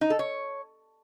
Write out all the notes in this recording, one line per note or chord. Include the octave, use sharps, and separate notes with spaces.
D#4
A4
C#5